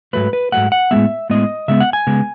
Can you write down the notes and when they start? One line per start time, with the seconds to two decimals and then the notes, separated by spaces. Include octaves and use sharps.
0.13 G#2 F#3 A3 B4
0.33 B4
0.52 G#2 F#3 A3 F#5
0.72 F#5
0.91 A2 G#3 B3 E5
1.30 A2 G#3 B3 D#5
1.68 C#3 G#3 B3 E5
1.80 F#5
1.93 G#5
2.07 C#3 G#3 B3